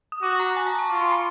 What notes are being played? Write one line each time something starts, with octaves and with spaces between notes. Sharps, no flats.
D#6
F#4 D6
A#5
G#5
A5
C#6
F4 D6
C#6
C6
B5